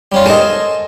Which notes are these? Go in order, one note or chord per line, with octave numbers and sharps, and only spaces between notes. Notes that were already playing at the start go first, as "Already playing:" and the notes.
G3 C#4 F4
A4 A#4 C5 D#5 G#5